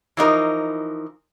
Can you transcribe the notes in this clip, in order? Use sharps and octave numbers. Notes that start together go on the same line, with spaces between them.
E3 F3 D#4 A#4